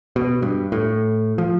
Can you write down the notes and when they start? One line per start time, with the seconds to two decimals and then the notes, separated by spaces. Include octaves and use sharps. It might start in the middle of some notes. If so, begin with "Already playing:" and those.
0.16 B2
0.42 G2
0.72 A2
1.38 F3